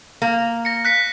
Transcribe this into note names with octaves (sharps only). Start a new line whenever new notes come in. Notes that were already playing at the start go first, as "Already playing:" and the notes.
A#3
A#6 C#7
F#6 B6 C#7